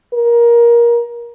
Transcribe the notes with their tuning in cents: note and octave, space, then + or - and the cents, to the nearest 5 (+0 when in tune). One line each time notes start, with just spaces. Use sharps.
A#4 +20